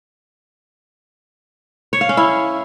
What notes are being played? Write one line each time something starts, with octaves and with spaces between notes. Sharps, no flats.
C#5
F5
C#4
E4